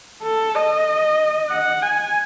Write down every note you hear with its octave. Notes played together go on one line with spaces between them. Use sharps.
A4
D#5
F#5
G#5